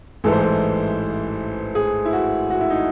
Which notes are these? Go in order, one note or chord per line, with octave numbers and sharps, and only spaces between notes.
A1 G#2 E3 G#3 A4
C5
A4
G#4
E4
F#4
F#4
E4
D#4